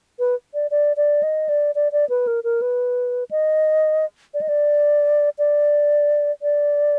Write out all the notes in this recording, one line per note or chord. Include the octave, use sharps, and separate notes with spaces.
B4
D5
D5
D5
D#5
D5
D5
D5
B4
A#4
A#4
B4
D#5
D5
D#5
D5
D5
D5